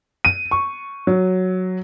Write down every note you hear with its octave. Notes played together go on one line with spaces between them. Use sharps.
D#7
C#6
F#3